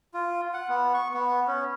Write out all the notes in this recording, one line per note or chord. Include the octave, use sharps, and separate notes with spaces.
F4
F#5
B3
C#6
B3
C#4